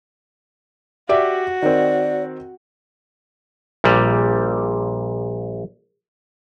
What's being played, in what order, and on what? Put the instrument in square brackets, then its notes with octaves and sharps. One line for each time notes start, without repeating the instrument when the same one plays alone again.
[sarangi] F#4 [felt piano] G4 D5 E5
[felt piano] D#3 C4 [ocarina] D5
[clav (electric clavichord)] A#1 A#2 G3